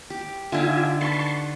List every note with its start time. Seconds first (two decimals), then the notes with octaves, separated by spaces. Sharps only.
0.10 G4
0.52 D3 D4 D#4 F4 E5 G#5
1.01 B4 A5 C6 C#6